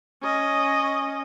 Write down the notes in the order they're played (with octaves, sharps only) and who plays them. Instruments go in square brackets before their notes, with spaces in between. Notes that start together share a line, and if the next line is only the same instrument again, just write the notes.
[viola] C#4 D#5